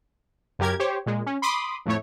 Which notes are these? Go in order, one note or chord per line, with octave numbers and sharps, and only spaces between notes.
F#2 C#3 G4 A#4 G#6
G4 C5 C#5
A#2 G#3
C#4
B5 C6 D6 D#6
F2 A2 A3 C#5